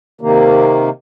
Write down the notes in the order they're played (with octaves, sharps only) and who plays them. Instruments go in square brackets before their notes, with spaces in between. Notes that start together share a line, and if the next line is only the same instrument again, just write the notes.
[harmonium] C3 D#3 A#3